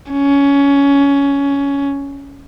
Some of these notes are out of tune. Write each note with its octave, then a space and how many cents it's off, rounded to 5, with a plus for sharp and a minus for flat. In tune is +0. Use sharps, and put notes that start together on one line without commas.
C#4 +15